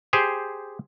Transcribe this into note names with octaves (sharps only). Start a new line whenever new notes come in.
G4 G#4 C5